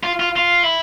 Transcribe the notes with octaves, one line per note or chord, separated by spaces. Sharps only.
F4
F4
F4
E4